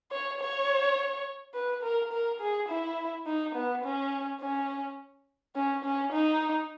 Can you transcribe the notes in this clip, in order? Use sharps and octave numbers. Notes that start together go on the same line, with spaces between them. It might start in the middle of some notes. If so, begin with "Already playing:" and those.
C#5
C#5
B4
A#4
A#4
G#4
E4
D#4
B3
C#4
C#4
C#4
C#4
D#4